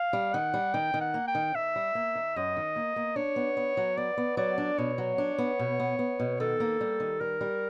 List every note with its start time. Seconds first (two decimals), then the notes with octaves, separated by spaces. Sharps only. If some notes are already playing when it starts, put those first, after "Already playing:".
Already playing: F5
0.13 G3
0.34 D#3 F#5
0.54 G3
0.74 D#3 G5
0.94 D#3
1.01 F#5
1.14 A#3
1.28 G5
1.35 D#3
1.55 D#3 E5
1.76 G3
1.95 A#3
2.15 D#3
2.36 F#2 D#5
2.57 D#3
2.76 A#3
2.96 A#3
3.16 D4 C#5
3.36 B3
3.57 B3
3.77 F#3
3.97 B3 D5
4.18 B3
4.37 F#3 D5
4.58 D4
4.78 B2 C#5
4.98 F#3
5.18 D4
5.38 B3
5.59 B2
5.80 B3
5.99 B3
6.20 B2
6.40 D#3 A4
6.60 A#3
6.81 G3
7.00 D#3
7.20 G3 A#4
7.41 G3